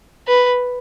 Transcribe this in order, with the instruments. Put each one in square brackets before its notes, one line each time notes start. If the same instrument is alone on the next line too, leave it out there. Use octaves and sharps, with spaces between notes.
[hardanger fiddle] B4